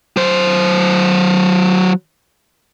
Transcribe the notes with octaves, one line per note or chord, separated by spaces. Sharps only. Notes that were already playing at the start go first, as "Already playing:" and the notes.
F#3 C5